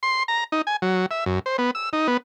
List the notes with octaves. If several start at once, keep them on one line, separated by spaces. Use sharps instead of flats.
C6
A#5
D#4
G#5
F#3
E5
F#2
C5
B3
E6
D#4
B3